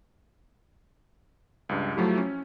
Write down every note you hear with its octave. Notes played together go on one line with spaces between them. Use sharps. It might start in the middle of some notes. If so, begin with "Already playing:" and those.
C#2 G2
F3 F#3 A3 E4 G4
C#4